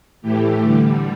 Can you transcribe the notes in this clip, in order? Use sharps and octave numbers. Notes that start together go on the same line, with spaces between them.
A2 E3 A3 G4
D3 G3